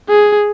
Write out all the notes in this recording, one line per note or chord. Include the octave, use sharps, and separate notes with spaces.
G#4